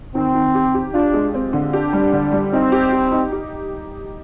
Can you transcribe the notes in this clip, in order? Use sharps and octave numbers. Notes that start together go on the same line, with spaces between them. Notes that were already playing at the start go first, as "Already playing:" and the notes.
D#3 C4
D#3
G4
G4
D4 F4
G#3
C4
D3
D4 G4
G3
D3
G3
C4 D#4
G4
G4
D#4
G4